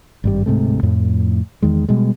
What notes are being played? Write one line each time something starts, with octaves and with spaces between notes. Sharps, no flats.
G#1 G2 G3
D1 G#2 C3 A3
F2 A2
E2 D#3 G#3
B2 G3 G#3